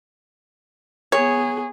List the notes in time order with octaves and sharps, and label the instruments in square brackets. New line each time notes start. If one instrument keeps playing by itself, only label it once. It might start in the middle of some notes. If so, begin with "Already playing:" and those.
[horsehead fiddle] B3 G#4 [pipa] C#5